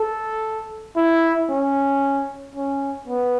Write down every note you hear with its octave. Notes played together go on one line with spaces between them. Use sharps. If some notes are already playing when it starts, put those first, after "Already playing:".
Already playing: A4
E4
C#4
C#4
B3